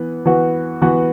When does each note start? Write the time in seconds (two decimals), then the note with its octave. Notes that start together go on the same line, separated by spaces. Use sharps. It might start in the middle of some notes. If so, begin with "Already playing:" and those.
Already playing: E3 B3
0.26 E3 B3 F#4
0.82 E3 B3 F#4